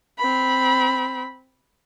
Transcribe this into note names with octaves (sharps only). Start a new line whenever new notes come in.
C4 B5